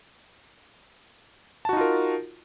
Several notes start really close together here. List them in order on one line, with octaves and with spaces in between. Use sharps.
A5 F#4 D#4 F4 A#4